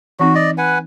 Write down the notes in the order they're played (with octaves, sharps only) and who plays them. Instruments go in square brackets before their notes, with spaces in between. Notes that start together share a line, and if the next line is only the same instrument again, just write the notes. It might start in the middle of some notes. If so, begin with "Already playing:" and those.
[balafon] E3 C4 D#4 [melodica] F#4
[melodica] D5 D#5
B4 F#5 G#5